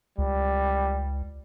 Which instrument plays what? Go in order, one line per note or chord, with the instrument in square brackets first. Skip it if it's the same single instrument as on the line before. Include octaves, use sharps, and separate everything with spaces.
[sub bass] C#2 [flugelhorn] G3